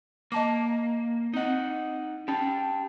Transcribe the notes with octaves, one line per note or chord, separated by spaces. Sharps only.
A#3 D#5 A5 D6
C4 D#4 D#5 F#5
C#4 G4 A5